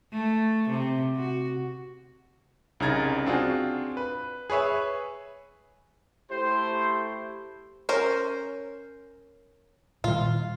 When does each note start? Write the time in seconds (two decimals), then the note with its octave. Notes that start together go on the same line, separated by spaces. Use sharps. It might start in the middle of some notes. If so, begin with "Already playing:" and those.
0.12 A3
0.69 C3
1.16 F#4
2.80 C2 C#3 D#4 A#5 G#6 A6
3.26 C4 D4 F4 F#4 G#4
3.97 B4
4.50 G#4 B4 C#5 E5
6.31 A3 E4 G4 C5
7.89 C#4 A#4 C5
10.04 A#2 D#3 G3 F4